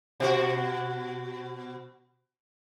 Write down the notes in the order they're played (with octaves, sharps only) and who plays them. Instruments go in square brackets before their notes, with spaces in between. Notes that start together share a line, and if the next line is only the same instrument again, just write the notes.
[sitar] B2 F#4